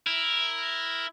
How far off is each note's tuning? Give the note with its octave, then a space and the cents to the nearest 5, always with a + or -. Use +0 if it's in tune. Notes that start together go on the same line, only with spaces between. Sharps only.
E4 +0 A#4 +0